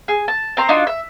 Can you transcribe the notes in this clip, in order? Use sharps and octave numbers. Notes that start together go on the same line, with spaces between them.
G#4
A5
C4 A#5 C6
D4 D#4 F4 F#4
E5